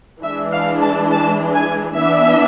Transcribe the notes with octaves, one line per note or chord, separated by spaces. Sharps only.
E3 G#3 D4 E5
F5
A5
A5
G#5
E3 B3 D4 E5